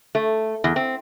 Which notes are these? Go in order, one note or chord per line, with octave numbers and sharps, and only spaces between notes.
A3
E2
C4